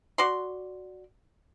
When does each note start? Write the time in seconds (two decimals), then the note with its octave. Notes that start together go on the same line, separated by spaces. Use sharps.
0.18 F#4 D5 C6